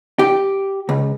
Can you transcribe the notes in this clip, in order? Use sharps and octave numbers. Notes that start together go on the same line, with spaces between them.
G4
C#2